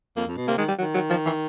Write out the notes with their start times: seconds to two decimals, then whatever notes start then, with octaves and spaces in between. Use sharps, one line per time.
0.16 F2 A#3
0.27 F2
0.37 B2
0.48 C3 A#3
0.58 D#3 G#3
0.68 G3
0.78 D#3 F#3
0.94 F#3
1.10 F3
1.26 E3